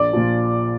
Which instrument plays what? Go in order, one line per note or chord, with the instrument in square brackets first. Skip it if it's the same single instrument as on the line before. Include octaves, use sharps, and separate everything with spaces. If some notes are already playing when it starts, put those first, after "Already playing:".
Already playing: [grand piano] A#1 [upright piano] D5
[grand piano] A#2 F3